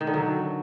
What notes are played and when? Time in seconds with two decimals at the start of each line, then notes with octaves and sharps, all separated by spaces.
0.01 D#3
0.07 D3
0.14 F#3